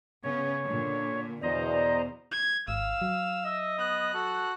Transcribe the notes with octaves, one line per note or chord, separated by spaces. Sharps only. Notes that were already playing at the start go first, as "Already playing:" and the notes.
C#3 B3 C#4 C#5
A#2 D3
E2 B2 C5 D5 D#5 A#5
G#6
G#1 F5 E6
F#3
D#5 E5
B3 F#6
F#4 A4